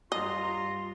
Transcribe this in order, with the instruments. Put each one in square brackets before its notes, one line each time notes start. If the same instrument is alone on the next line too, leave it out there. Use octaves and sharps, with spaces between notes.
[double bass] G2 G3 [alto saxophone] F4 [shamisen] D#5 [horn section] A#5 C6